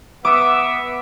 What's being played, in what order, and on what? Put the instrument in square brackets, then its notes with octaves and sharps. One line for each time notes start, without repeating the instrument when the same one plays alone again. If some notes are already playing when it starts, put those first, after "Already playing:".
[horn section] B3 E5 [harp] D6 D#6